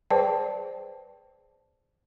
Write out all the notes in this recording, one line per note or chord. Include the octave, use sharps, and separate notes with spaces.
G#4 B4 C5 D5 G5 A5